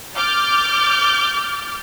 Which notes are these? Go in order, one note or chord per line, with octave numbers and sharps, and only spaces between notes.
D6 F6 G6 A6